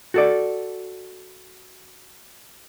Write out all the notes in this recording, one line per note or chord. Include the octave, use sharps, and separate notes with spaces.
F#4 A4 D5